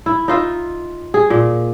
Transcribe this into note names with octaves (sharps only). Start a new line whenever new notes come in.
E4
D#4 F4 E5
G#4
A#2